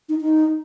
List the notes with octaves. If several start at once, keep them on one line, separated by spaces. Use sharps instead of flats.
D#4
D#4